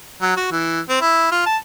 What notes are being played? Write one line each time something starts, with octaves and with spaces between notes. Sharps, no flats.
F#3
F#4
E3
C4
E4
F4
A5